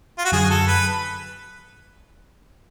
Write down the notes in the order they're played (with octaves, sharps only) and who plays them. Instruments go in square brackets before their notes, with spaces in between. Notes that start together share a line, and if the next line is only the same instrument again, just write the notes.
[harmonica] F4
F#4
[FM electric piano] F#2 D3 F#3 [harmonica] G#4
[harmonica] A4
B4